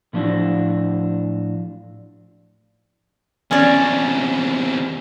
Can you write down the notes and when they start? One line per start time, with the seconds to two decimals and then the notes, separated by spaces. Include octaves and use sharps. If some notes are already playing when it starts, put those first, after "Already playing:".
0.13 A2 F3 C#4 D4 E4 F#4
3.51 E2 C3 C#4 D5